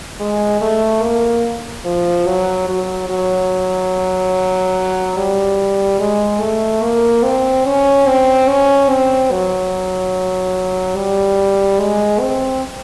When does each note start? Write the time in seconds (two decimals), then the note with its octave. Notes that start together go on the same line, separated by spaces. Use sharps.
0.20 G#3
0.61 A3
1.03 A#3
1.85 F3
2.27 F#3
2.69 F#3
3.09 F#3
5.17 G3
5.99 G#3
6.41 A3
6.82 A#3
7.24 C4
7.66 C#4
8.07 C4
8.49 C#4
8.89 C4
9.31 F#3
10.97 G3
11.79 G#3
12.21 C4